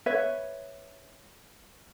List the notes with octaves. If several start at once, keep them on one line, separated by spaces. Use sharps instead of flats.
B4 C#5 E5